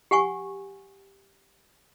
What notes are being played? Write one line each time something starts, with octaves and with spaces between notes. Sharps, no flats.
G4 F#5 G#5 C#6